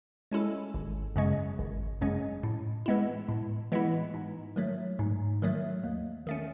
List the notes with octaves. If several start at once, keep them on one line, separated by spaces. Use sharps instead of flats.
G#3 C#4 E4 A4
G#1
F#2 C#3 G#3 C#4
G#1
F#2 C#3 G#3 C#4
A2
E3 G#3 B3 E4
A2
E3 G#3 B3 E4
G#2
D#3 F#3 A3
G#2
D#3 F#3 A3
D#2
D#3 A3 C#4